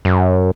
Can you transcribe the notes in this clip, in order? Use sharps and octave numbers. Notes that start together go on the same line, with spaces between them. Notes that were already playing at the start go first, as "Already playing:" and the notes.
F#2